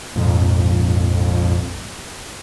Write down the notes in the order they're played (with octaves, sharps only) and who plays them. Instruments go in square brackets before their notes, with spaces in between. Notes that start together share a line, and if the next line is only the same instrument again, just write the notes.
[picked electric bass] A#1 G#2 [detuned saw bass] F2